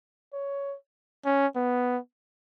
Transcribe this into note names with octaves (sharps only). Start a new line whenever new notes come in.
C#5
C#4
B3